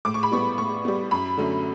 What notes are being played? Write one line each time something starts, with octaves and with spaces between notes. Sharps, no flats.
A2 D6
C#6
B5
G3 B3 C#6
A2 C#6
G3 B3
F#2 B5
D3 F#3 A3 C#4